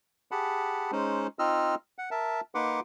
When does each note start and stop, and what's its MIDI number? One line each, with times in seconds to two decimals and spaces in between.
0.31 0.91 67
0.31 0.91 68
0.31 0.91 78
0.31 0.91 81
0.31 0.91 83
0.92 1.27 56
0.92 1.27 61
0.92 1.27 63
0.92 1.27 72
1.39 1.75 60
1.39 1.75 63
1.39 1.75 65
1.39 1.75 75
1.39 1.75 88
1.39 1.75 89
1.98 2.10 78
2.11 2.41 70
2.11 2.41 76
2.11 2.41 81
2.55 2.80 58
2.55 2.80 63
2.55 2.80 71
2.55 2.80 78
2.55 2.80 84
2.55 2.80 86